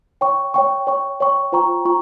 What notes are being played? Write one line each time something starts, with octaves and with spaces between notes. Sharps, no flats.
C#5 G5 C#6
C#5 G5 C#6
C#5 G5 C#6
C#5 G5 C#6
F4 C5 G5 A#5 C#6
F4 C5 G5 A#5 C#6